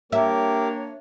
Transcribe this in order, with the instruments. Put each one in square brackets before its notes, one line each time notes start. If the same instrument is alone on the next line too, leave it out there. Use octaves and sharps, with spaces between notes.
[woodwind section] A#3 D4 C#5 [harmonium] G4 A#4 [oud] E5